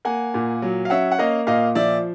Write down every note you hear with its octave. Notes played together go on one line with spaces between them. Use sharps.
A#3 F#5 G#5
A#2
F#3
F5
C#4 E5 F#5
F#5
A#3 D#5 F5
A#2 D#5 F5
F3 D5 E5